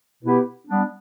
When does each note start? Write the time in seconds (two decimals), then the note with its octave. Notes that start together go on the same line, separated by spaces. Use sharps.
0.23 B2 B3 E4 G4 B4
0.68 G3 B3 D4